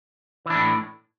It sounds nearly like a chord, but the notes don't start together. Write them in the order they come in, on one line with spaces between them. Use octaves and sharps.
E3 D4 A2